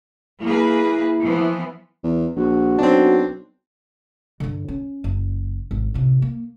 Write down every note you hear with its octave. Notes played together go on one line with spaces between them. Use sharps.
A#3 E4 G#4 B4
E3 F3 B3
E2
A#1 F#4
B1 C4 D4
G2 D3
C#4
F#1
G#1
A1 C3
A#3